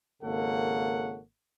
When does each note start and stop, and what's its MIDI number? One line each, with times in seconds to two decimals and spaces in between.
0.23 1.20 32
0.23 1.20 49
0.23 1.20 58
0.23 1.20 69
0.23 1.20 73
0.23 1.20 78